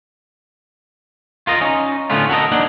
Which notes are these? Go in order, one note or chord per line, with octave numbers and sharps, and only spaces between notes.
F4 A#4 D#5
C#4 D#4
A2 D3 A3 B3 C#4 F4
F#4 A4 A#4 D#5
A#3 D4 D#4 F#5